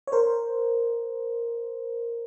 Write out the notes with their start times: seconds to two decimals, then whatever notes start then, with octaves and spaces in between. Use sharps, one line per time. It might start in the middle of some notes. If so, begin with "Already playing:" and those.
0.07 C#5
0.12 A#4 C5